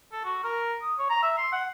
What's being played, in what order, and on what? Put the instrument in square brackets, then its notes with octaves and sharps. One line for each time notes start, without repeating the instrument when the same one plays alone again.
[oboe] A4
F#4
A#4
D#6
C#5
A#5
E5
C6
F#5